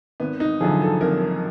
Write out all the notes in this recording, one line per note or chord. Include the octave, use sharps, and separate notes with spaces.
G#1 B3
D#4
F#2 D3 F3 G#4
A4
G#1 A#4